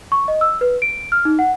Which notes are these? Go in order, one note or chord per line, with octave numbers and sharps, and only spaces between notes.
C#6
D#5
E6
B4
D7
F6
D#4
F#5